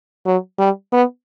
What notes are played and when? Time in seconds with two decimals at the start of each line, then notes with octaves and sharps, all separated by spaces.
0.26 F#3
0.59 G3
0.92 B3